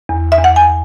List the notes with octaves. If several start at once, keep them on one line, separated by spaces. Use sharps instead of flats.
E2
E5
E2
F#5
G#5